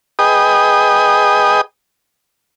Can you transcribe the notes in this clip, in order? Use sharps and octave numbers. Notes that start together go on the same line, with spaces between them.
G#4 B4 D#5 G5 D#6